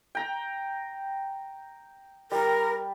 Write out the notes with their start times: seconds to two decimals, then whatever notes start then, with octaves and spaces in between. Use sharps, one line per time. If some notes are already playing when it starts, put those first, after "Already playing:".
0.15 G5 A#5
2.32 G3 A#4